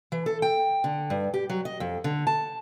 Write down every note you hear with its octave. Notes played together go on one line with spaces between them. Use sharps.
E3
A4
G5
D3
G2
G4
F#3
D#5
F2
D3
A5